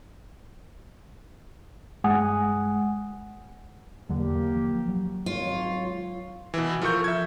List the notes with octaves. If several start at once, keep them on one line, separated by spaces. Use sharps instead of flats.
G2 G#3 F#5 G#5 D#6
E2 D3 F#3 A#3 G4
F3
F#3
G#1 C#2 F4 C#5
B2 E3
F3 A4 A#4 C#6 G6
E5 G#6